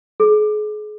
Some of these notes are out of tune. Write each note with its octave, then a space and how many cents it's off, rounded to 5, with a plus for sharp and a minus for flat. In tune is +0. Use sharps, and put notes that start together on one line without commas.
G#4 +35